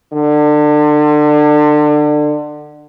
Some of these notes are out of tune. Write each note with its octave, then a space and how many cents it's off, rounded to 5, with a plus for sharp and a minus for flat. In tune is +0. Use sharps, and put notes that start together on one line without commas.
D3 +30